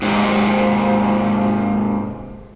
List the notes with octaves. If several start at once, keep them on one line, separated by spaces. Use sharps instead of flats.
G#2 C3